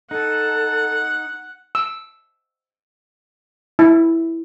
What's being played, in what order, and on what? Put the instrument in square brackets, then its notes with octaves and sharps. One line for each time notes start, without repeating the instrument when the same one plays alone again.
[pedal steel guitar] D#4 [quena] A4 [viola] F#5
[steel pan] E6
E4